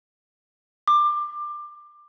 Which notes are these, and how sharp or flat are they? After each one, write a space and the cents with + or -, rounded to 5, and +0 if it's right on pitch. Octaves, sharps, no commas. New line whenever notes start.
D6 +20